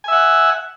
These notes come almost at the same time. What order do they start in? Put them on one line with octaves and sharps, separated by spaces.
G#5 E5 F#5